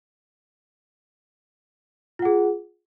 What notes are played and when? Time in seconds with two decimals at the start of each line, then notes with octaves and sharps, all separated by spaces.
2.19 F4
2.22 F#5
2.25 G#4